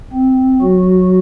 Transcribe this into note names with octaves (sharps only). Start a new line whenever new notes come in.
C4
F#3 F#4